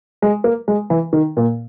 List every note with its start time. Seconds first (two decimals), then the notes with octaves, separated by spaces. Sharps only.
0.22 G#3
0.44 A#3
0.68 G#3
0.90 E3
1.13 D#3
1.37 A#2